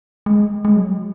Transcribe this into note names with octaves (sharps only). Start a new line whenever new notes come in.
G#3
G#3
F#3